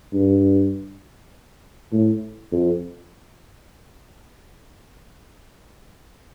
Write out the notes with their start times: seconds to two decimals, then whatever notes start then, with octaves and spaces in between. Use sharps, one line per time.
0.13 G2
1.92 A2
2.52 F2